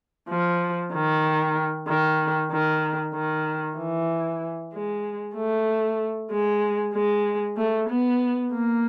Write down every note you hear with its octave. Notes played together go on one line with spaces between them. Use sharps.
F3
D#3
D#3
D#3
D#3
E3
G#3
A3
G#3
G#3
A3
B3
A#3